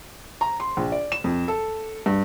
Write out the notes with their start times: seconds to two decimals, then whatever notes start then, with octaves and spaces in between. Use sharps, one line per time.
0.41 A#5
0.60 C6
0.77 A#1
0.92 D5
1.12 E7
1.24 F2
1.48 A4
2.06 G2